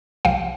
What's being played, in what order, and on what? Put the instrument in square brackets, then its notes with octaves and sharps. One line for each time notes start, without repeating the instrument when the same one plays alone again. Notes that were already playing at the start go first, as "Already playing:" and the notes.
[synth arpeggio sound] C2 C3 F3 F5 G5